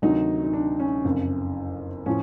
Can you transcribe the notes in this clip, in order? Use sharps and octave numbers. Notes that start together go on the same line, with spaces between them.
D2 C3 D#3 F#3 D#4
D#4
D4
C#4
F#1 F2 C#3
A2 F3 C#4